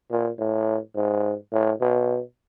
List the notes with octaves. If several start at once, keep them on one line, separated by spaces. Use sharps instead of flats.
A#2
A2
G#2
A2
B2